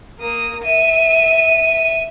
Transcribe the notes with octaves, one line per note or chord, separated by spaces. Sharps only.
A#3 D#6
E5 D#7